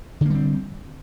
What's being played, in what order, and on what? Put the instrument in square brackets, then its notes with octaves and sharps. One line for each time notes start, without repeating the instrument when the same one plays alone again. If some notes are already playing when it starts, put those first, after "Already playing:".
[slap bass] D3
A#3
G3
C4